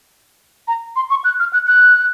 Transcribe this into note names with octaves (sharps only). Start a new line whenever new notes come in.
A#5
C6
C#6
F#6
F6
F#6
F#6